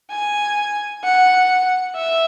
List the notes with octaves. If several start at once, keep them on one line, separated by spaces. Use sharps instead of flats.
G#5
F#5
E5